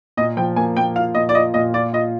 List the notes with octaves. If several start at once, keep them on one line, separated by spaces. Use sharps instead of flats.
A#2 D#5
F3 G5
A#3 G#5
A#3 G5
F4 F5
A#2 D#5
D5
F4 D#5
A#2 D#5
F4 D5
F4 D#5